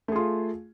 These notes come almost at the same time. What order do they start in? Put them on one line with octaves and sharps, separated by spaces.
A3 G#4 F4